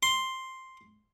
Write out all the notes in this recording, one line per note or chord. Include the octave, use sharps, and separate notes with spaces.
C6